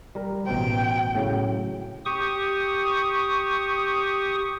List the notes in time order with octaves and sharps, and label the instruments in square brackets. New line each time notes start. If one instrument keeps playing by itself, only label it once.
[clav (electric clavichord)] G3 A#4
[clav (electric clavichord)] A1 B2 C5 [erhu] G5
[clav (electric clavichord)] A2 C#3 F#3
[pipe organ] G4 C#6 D#6